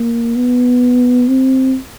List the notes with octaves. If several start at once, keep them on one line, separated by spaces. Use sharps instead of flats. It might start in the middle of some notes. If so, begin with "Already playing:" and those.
Already playing: A#3
B3
C4